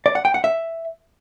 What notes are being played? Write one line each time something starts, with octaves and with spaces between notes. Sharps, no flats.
D5
F#5
G5
F#5
E5